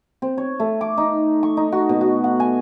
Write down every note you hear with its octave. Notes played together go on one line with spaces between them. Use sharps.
C4
C#5
A3
D6
D#4
C#6
D#4
F#4
B2
F#4
F#5
G#5